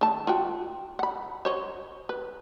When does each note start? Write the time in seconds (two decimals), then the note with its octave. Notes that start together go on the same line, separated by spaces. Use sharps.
0.01 D#3 A3 A5
0.27 F4 F#4 G5
0.99 F#5 B5
1.45 C5 C#5 D#5
2.09 B4